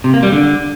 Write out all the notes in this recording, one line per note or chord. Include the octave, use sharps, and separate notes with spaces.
C3
A#3
G3
D3